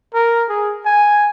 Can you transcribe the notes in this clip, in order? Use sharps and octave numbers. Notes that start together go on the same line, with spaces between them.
A#4
G#4
G#5